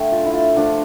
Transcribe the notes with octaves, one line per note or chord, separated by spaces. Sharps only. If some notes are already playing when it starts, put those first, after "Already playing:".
Already playing: D3 A3 G5
F4
E4
F4
D3 F3 A3 D4